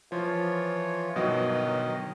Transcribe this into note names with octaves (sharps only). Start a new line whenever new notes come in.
E3 F3 F4 C#5
G1 B2 D#3 F#3 D#5